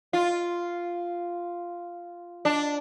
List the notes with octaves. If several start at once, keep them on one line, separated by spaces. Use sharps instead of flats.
F4
D4